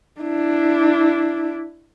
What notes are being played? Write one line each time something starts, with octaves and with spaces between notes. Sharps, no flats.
D4 E4